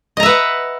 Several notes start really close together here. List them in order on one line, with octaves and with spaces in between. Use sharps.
D#5 A#5 E5 B4 F#5